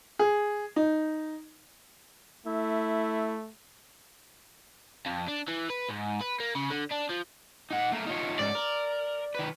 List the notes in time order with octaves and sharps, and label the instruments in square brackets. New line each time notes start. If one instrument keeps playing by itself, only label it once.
[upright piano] G#4
D#4
[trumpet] A3 [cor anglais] E4
[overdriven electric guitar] F2
D4
E3
B4
G#2
B4
A#3
C#3
D3
D4
F3
[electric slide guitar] D#4 F#5
A3 A#3
D#4 F4 C#5
[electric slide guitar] G#2 C#4 [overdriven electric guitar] D5
[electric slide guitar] A#4
D#3 B4